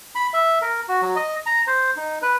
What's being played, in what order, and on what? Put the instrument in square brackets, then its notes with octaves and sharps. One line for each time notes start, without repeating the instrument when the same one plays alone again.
[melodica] B5
E5
A#4
F#4
F#3
D#5
A#5
C5
D#4
B4